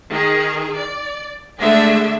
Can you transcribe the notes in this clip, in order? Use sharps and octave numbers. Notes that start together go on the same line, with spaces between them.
D#3 G#4
D5
D3 G#3 A3 D4 G#4 E5